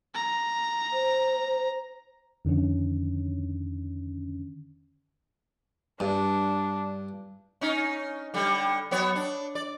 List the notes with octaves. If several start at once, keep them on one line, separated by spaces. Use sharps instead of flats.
A#5
C5
F2 D3 D#3 C#4
G2 D4
C#4 D#4
D3 G3
F#3 B3 C#5
D4
D5